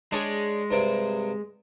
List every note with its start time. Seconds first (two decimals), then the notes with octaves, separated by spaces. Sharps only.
0.12 G#3 D4 G#4 C#5
0.71 G2 C3